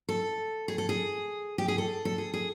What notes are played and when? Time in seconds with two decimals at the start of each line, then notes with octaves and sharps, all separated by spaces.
0.09 A4
0.68 G#4
0.78 A4
0.89 G#4
1.58 G4
1.68 G#4
1.78 A4
2.05 A4
2.18 G#4
2.34 G#4